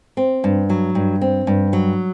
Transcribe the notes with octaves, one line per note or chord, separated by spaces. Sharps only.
C4
G2
F#3
G2
C4
G2
F#3